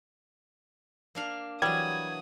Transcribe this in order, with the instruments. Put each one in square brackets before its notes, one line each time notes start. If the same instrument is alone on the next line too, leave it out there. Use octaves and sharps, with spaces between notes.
[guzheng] A#3 D4 F5
[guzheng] E3 F#3 [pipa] G3 [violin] F#4 D#6 [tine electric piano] G#6